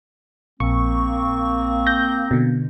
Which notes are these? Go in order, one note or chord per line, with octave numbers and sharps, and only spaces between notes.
A#1 A#3 C4 C#6
G6 A#6
B2 D3